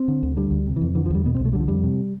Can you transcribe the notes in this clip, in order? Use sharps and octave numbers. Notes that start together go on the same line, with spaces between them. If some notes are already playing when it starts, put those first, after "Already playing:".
Already playing: C4
D3
D2
D3 G3
D2
C3
E3
F2
D3 E3
F3
E2 G3
B2 B3
C2 C4
A3
D3 G3
F3
F2 G3
C3